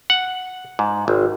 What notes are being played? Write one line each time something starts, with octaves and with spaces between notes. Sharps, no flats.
F#5
G#2
G#1